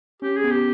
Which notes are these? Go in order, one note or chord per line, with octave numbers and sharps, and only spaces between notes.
C#4 G4
G#4
B3
G4